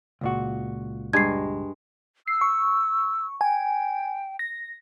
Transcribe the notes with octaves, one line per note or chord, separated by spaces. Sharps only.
C#2 A#2 F#4
G2 G#3 G#6 C7
E6 C7
C#6
G5 G#5
A#6